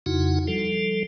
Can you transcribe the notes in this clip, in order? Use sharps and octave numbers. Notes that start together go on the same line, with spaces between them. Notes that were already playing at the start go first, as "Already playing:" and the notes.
F2 C#3 D#4 E4 F#4 F#5
F3 G3 A4